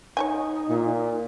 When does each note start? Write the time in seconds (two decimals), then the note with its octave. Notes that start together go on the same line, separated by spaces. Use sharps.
0.17 D#4 C#5 E5 G#5
0.69 A#2